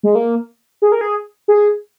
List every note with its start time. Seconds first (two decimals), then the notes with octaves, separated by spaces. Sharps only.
0.03 G#3
0.15 A#3
0.82 G#4
0.92 A#4
1.01 G#4
1.48 G#4